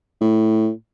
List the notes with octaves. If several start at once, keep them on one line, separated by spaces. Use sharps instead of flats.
A2